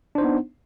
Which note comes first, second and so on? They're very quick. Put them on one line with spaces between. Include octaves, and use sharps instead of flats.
D4 C5 D#4 B3